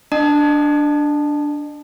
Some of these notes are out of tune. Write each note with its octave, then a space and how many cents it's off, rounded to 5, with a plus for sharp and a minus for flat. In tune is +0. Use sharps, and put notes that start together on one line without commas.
D4 +0 D#5 -40 A5 +0